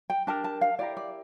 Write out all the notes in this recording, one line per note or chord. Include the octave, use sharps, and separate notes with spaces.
G5
D4 G4 A#4 A5
A5
F5
E4 G4 A#4 D5
D5